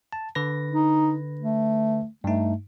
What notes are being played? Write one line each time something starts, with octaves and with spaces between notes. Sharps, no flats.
A5
D3 B4 A#6
D#4
A3
G2 A3 D#4